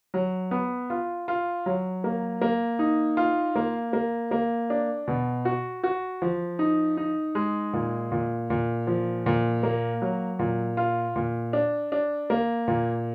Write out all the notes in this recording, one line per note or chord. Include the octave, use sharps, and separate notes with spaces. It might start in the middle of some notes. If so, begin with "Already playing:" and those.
F#3
B3
F4
F4
F#3
A#3
A#3
D#4
F4
A#3
A#3
A#3
D4
B2
F#4
F#4
F3
D#4
D#4
G#3
A#2
A#2
A#2
F3
A#2
A#3
F#3
A#2
F4
A#2
D4
D4
A#3
A#2